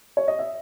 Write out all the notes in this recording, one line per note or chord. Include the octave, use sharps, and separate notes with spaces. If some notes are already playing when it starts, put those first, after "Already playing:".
C#5
D#5
E5